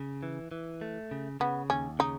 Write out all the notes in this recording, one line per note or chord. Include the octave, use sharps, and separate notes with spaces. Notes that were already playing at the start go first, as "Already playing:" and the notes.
Already playing: C#3
E3
E3
A3
C#3
C#3 B3
D#2 C#4
C#3 D#4